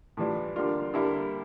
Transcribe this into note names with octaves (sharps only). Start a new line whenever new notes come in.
A2 E3 G3 D4 F4
D3 G3 A#3 D4 F4
D3 G3 A#3 E4